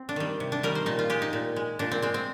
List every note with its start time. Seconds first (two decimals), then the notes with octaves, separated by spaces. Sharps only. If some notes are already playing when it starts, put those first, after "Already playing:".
Already playing: C4
0.09 D4
0.16 D#3 G3
0.40 C3
0.52 D4
0.63 D#3 G3 A#4
0.75 C5
0.86 A#2 D#4
0.99 F4
1.10 G#3 G4
1.22 D#4
1.33 A#2
1.56 G#3
1.79 A#2 D4
1.92 C4
2.02 G#3 C4
2.14 C4